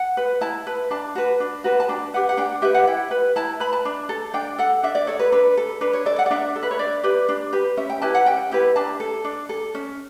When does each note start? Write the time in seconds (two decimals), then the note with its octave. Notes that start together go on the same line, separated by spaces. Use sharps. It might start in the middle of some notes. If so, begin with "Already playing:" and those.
Already playing: F#5
0.17 B4
0.41 E4 A5
0.67 B4
0.91 D4 A5
1.15 F#4 B4
1.40 D4
1.64 F#4 B4
1.80 A5
1.89 D4 G5
2.14 G4 B4 F#5
2.29 F#5
2.37 D4 G5
2.62 G4 B4 E5
2.74 F#5
2.87 E4 G5
3.11 B4
3.36 E4 A5
3.60 B4 B5
3.73 A5
3.85 D4
4.09 A4
4.34 D4 G5
4.58 A4 F#5
4.83 D4 E5
4.95 D5
5.07 A4 C#5
5.19 B4
5.32 D4 B4
5.57 A4
5.81 D4 B4
5.93 C#5
6.05 A4 D5
6.19 F#5
6.26 D5
6.31 D4 E5
6.56 A4
6.63 B4
6.71 C#5
6.79 D4 D5
7.03 G4 B4
7.29 D4
7.53 G4 B4
7.77 C#4 E5
7.90 G5
8.02 E4 G4 B4 A5
8.15 F#5
8.26 C#4 G5
8.51 E4 G4 B4
8.76 D4 A5
9.00 A4
9.24 D4
9.49 A4
9.75 C#4